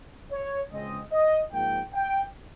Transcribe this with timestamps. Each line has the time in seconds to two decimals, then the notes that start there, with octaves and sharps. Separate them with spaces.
0.31 C#5
0.71 C#2 C#3 G#3 C4 D#5
1.12 D#5
1.52 G#2 F3 A#3 G5
1.93 G5